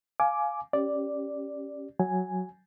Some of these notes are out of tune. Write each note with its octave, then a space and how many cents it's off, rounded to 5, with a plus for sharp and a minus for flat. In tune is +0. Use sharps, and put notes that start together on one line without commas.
F5 +0 G#5 +20 D6 +0
C#4 -5 G4 +0 D5 +0
F#3 +0 G#5 +0